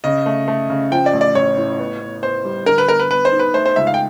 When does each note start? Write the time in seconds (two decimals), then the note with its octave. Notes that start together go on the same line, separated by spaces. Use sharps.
0.04 C#3 D#5
0.26 A3
0.48 A3
0.70 C#3
0.92 F3 G5
1.06 D5
1.13 A1
1.21 D5
1.35 A1 C#5
1.57 A2
1.79 B3
2.01 B3
2.23 B3 C5
2.45 G3
2.66 D3 A#4
2.78 B4
2.88 B3 A#4
3.00 B4
3.11 B3 B4
3.25 C5
3.32 D#4
3.39 B4
3.54 A3 C5
3.66 C5
3.76 C#2 E5
3.87 F5
3.94 G5